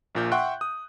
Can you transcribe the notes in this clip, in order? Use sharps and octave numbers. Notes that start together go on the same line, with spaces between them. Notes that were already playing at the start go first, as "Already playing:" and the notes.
A#1 A#2 G6
E5 F#5 G5 C6 C#6 F#6
D#6